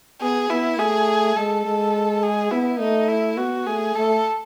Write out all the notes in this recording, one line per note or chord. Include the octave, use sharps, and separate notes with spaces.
B3 G#4
B3 E4
A3 G#4
G#3 A4
G#3
G#4
B3 E4
A3 D#4
E4
B3 F#4
A3 G#4
A3 A4